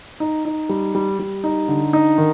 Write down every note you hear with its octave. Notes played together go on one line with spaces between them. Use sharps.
D#4
D#4
G3
G3
G3
D#4
D3
D#4
D#3